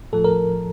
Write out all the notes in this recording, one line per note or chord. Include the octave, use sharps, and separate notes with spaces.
A2 F3 A4
A#4